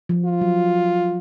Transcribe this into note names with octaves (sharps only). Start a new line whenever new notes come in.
F3
F4
F#3